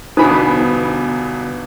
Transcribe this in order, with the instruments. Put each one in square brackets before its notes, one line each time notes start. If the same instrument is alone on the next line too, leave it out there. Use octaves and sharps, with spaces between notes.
[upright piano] G1 E2 B2 [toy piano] D4 D#4 C5 [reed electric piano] B5 D#6